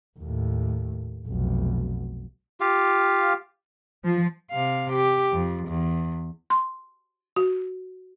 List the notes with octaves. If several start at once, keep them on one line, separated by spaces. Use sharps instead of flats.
D#2 A2
F1 B1
F4 G4 F5
F3
C3 F5
G4
F2
E2
C6
F#4